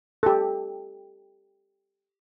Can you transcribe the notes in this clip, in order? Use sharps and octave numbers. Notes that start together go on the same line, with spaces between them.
G4 A4